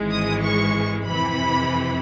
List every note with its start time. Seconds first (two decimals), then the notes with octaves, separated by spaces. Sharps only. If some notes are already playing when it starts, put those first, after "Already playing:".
Already playing: G#1 G#2 E3 G#3
0.12 D#6
0.43 C#6
1.06 F2 C3 E3 B5